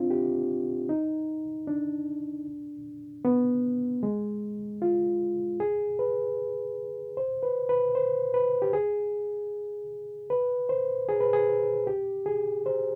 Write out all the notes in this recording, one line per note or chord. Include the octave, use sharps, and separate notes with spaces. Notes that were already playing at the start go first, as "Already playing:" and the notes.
Already playing: C4 D4 F4
G4
D#4
D4
B3
G#3
F4
G#4
B4
C5
B4
B4
C5
B4
G4
G#4
B4
C5
G#4
B4
G#4
G4
G#4
C5